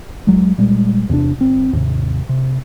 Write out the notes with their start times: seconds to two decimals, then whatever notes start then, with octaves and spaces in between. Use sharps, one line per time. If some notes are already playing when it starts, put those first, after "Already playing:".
0.27 C#2 F#3 G#3
0.58 A#2 G3 G#3
1.09 E2 C3 B3 D4
1.38 G1 C4
1.73 D#2 G#2 C3
2.29 C3